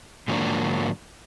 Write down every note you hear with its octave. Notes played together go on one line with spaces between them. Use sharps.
G#2 D3 F3 F#3 A#3 D4